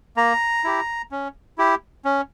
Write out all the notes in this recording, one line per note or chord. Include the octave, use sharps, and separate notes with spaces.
A#3 A#5
E4 G4
C#4
E4 G4
C#4